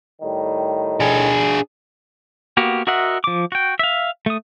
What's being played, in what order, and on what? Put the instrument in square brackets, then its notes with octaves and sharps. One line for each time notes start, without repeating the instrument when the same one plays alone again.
[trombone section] A2 D#3 G3
[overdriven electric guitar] D4 G#4
[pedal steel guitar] A#3 B3 F#4 G4
F#4 A#4 D#5 E5 F#5
F3 D6
F#4 G5
E5 F5
A3 D#6